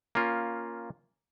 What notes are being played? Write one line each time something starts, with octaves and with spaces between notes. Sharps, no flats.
A#3 C#4 F4